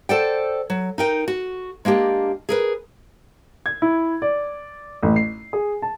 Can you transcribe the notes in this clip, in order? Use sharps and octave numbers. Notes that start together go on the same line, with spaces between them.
A4 C5 D5 F#5 G5
F#3
D#4 A#4 G5
F#4
G#3 A#3 D4 G4
G#4 A#4 B4
G#6
E4
D5
A1
C7
G#4
A5